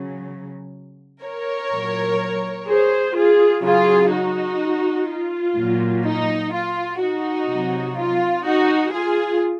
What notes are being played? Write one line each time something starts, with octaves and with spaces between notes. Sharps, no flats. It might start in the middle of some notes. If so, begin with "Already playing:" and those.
Already playing: C#3 F#3
A#4 C#5
A#2 F#3
G#4 C5
F4 G#4
C#3 F#3 F4 G#4
D#4 F#4
F4
A#2 F#3
D#4
F4
D#4 F#4
C3 F#3
F4
D#4 F#4
F4 G#4